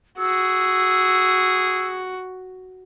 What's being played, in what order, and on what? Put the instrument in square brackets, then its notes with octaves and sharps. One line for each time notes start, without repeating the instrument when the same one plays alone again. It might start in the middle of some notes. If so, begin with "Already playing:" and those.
[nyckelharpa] F#4 [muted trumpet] G#4 [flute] E6